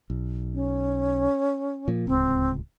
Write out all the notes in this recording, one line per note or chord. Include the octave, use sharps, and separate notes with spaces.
B1
C#4
A#2 F3
D1 C#2 C4